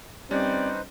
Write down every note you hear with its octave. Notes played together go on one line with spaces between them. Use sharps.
G3 C4 C#4 D#4 B4 C5 D5